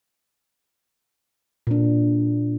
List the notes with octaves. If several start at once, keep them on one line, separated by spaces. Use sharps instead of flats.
A#2 D4